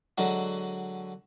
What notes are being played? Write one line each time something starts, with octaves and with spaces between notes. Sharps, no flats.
D3 F#3 G#3 F#4